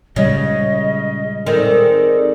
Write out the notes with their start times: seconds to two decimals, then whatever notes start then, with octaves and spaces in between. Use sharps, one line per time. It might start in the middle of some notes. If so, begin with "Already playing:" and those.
0.16 A#2 C#3 G3 G#3 D#5
1.46 D#3 C4 G#4 A4 D5